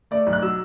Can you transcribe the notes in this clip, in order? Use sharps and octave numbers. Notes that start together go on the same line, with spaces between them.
A3 D5
B1
F#6
F#3 E6